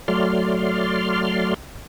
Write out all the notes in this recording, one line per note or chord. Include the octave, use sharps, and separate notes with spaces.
F#3 A3 D5 C6 F6